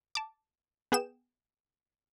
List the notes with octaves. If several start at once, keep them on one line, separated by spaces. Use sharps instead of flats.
A5 D6
B3 G#4 G5 E7